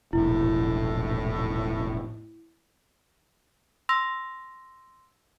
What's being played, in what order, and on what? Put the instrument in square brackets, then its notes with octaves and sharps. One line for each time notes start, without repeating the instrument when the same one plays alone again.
[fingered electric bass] E1 A#1 [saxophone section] A2 [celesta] E4
[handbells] C6 E6 A#6